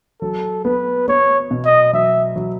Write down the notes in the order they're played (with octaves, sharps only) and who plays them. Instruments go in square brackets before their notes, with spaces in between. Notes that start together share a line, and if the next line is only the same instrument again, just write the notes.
[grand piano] F#3 [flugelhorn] A4
[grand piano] B3 [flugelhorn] B4
[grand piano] B3 [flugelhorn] C#5
[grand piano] B2
[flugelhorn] D#5
[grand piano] F#3 [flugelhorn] E5
[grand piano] F#3